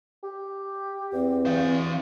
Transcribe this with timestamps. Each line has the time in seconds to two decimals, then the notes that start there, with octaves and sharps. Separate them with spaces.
0.23 G4
1.13 E2 C4
1.46 E3 F5